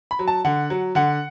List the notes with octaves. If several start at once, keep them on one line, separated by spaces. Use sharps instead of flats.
B5
F#3
A5
D3 F#5
F#3
D3 F#5